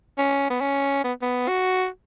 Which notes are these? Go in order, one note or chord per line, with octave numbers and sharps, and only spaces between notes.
C#4
B3
C#4
B3
B3
F#4